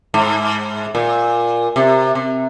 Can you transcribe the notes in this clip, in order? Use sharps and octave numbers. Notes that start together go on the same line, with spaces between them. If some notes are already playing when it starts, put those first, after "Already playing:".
G#2
A#2
C3
C3